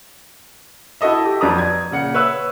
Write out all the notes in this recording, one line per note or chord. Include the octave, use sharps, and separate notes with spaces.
E4 F#4 A4 D#5 E5
G4
F2 F#3 B4 D5 A#5 D#6
G#6
A#2 C#3 F#5 C#7
B4 C#5 E5 E6 F#6